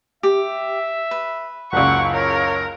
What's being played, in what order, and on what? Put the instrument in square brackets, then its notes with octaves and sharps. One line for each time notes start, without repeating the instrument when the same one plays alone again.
[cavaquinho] G4 [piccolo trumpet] E5
[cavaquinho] B4
[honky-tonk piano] F#1 C#2 [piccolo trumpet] F#5 [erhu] C#6
[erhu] A#4 [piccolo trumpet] C#5